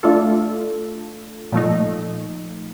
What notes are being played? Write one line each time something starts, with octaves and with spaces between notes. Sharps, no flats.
A3 D4 F4 A4
A#2 F3 A3 D#4